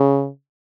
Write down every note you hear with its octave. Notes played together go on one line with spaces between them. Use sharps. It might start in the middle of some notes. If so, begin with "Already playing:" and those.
Already playing: C#3